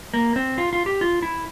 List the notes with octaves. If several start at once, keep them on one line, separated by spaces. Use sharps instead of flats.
A#3
C4
F4
F4
G4
F4
E4